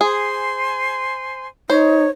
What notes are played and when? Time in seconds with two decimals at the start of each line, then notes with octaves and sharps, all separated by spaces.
0.01 G#4 C5 G#5 C6
1.70 D#4 C5 C#5